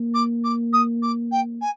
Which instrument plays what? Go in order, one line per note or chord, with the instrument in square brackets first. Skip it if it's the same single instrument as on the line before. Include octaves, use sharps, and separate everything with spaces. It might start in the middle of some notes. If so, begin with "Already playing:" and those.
Already playing: [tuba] A#3
[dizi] D6
D6
D#6
D6
G5
G#5